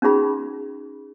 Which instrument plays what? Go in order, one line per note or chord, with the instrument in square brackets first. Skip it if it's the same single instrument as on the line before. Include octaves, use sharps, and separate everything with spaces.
[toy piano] C#4 D#4 F#4 G#4 B5